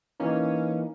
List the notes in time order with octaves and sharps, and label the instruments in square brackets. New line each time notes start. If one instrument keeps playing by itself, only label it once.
[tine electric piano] E3 A#3 D#4 [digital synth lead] C#4